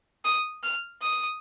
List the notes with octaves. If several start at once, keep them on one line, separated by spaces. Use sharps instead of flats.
D#6
F6
D#6